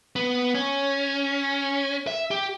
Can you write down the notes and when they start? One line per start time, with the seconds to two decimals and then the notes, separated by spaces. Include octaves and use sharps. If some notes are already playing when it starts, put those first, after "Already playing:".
0.16 B3
0.55 C#4
2.07 E5
2.31 G4